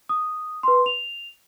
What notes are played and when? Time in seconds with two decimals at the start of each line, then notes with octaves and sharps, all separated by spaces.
0.09 D#6
0.63 B4 C6
0.86 F7